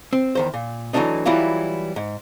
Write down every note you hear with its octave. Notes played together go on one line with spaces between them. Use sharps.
C4
E2 D#3 C5
A#2
E3 F#3 G#3 A3 D4 D#4
E3 F#3 G3 E4 F4
G#2